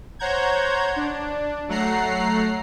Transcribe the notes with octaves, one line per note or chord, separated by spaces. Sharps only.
C5 C#5 F#5 A#5 G6 G#6
D4
F#3 A3 F#5 A#5 C7